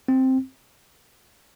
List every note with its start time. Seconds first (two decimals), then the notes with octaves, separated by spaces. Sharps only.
0.08 C4